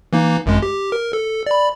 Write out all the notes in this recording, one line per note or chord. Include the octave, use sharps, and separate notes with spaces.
E3 A#3 D#4
G#1 F#2 G#3
G4
A#4
A4
D5 B5